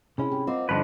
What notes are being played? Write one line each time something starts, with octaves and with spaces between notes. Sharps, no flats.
C3 C4 C#4 E4 G#4 B5
G4
C4 F4 A#4 C5 D#5 F#5 D6
G2 D3 D#3 F3 D4 B4 D#5 A5